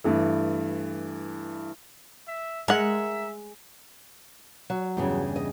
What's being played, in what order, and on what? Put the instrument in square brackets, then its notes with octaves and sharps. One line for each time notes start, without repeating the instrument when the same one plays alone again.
[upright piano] G2 E3 A3
[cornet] E5
[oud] G#3 [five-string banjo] A#4 F#5 [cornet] E5
[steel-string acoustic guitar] F#3
[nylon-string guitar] E2 G2 C#3
[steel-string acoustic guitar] D#5